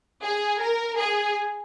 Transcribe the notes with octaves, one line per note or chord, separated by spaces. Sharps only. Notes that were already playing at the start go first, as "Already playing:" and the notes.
G#4
A#4
G#4